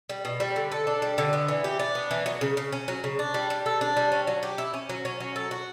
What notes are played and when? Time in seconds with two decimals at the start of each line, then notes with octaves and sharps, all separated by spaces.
0.09 G3
0.25 B2
0.40 G3
0.56 D3
0.72 A4
0.87 D4
1.02 G3
1.18 D3
1.33 B3
1.48 E3
1.64 G4
1.79 D4
1.95 B3
2.11 E3
2.26 F#3
2.41 C#3
2.57 C#3
2.72 C#4
2.88 F#3
3.04 C#3
3.19 D4
3.34 G3
3.50 G3
3.66 A4
3.81 D4
3.97 G3
4.12 C#4
4.27 F#3
4.43 G4
4.58 E4
4.74 C#4
4.89 F#3
5.05 C#4
5.20 F#3
5.36 A4
5.51 F#4